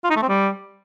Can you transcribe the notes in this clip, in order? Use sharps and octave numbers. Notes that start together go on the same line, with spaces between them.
F4
D#4
A3
C4
G3